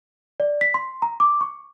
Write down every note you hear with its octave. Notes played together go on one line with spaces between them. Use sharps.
D5
B6
C6
A#5
D6
C#6